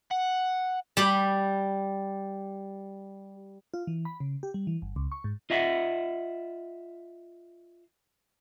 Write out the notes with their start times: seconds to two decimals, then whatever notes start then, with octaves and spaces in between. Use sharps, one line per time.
0.11 F#5
0.97 G3 G4 B5
3.74 F4
3.87 E3
4.05 B5
4.20 C#3
4.43 G4
4.54 G3
4.67 E3
4.82 G1
4.96 C#2
5.12 C#6
5.24 G#2
5.50 F4 D#5 E5 F#5